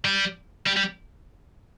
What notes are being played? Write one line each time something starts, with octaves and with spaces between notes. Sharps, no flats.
G3
G3
G3